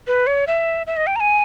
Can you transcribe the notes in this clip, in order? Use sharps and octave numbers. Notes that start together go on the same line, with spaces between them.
B4
C#5
E5
E5
D#5
G5
A#5
G#5